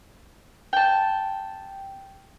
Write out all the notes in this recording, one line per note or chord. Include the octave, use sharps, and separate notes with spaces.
G5 A5